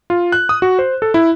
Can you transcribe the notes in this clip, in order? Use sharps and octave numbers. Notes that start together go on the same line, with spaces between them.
F4
F#6
D#6
F#4
C5
A4
E4